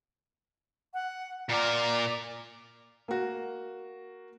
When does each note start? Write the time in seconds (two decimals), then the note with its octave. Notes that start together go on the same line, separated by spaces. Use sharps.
0.94 F#5
1.49 A#2 A#4 D5
3.08 A#3 F#4